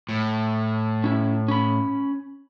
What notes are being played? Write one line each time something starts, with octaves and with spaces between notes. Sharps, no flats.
A2
C#4 E4
C#4 B5